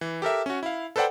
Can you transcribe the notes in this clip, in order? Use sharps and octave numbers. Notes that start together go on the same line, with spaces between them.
E3
G4 A4 A#4 E5
C#4 F#4
E4 F5
A4 B4 C5 D5 F#5 G5